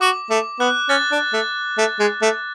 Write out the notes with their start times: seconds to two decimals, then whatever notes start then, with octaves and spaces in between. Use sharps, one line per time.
0.01 F#4 D6
0.30 A3 D6
0.60 B3 F#6
0.89 C#4 A6
1.12 D4
1.33 A3
1.78 A3
2.00 G#3
2.22 A3